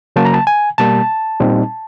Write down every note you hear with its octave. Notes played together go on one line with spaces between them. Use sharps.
C#3 F#3 A#3 A5
A#5
A5
G#5
B2 G3 A#3 A5
A#2 G3 C4 D#4